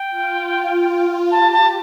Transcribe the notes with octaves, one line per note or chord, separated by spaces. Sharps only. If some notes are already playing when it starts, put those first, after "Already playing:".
Already playing: G5
F4
F4
G4 A5
A5